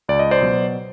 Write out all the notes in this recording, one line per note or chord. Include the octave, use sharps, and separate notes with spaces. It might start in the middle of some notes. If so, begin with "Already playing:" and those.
C#2 D5
D#5
C5 D5
B2 F#3